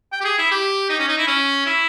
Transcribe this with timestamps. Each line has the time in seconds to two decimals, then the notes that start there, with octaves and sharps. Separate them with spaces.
0.13 G5
0.21 G4
0.25 G#4
0.39 E4
0.51 G4
0.90 D#4
0.99 C#4
1.08 D#4
1.18 E4
1.27 C#4
1.66 E4